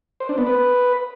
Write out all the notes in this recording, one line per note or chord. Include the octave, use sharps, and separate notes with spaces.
C5
D4
B3
B4